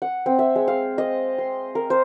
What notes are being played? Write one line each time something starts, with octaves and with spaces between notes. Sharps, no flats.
F#5
C4
E5
G#3
F5
D#5
C6
A#4
C5